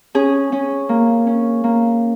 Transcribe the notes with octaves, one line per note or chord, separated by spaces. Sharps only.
C#4 G#4
C#4
A#3
C#4
A#3